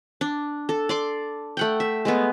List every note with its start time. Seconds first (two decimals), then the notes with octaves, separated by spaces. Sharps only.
0.21 D4
0.69 A4
0.89 D5 C6 D6
1.57 A3 F#5 G5
1.80 E5
2.05 G#3 A3 B3